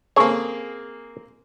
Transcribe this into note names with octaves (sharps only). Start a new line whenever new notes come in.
A#3 C4 C#4 G#4 A4 C#5